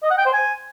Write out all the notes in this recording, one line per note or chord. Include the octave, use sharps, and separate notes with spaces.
D#5
F#5
G5
C5
G#5